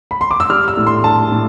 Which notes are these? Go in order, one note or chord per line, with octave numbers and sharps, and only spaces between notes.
B5
C6
D6
E6
G3 F6
E6
A2
C6
G3 A5
A2